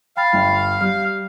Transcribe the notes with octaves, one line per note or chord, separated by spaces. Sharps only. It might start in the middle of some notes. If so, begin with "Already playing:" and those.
F5 G5 B5 A6
G1
G3 F6